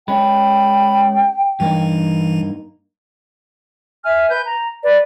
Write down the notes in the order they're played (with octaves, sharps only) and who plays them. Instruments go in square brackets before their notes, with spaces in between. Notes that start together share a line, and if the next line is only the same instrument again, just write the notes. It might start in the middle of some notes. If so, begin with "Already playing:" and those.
[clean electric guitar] G#3 C#4 [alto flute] G5 [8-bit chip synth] B5
[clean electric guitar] G2 A#3 D#4 [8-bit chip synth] E3
[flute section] E5 G#5 F6
B4 G6
A#5
B4 D5